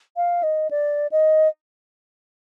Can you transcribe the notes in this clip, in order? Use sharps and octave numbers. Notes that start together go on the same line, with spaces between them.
F5
D#5
D5
D#5